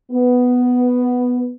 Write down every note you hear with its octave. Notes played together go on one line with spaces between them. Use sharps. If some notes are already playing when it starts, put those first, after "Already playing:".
B3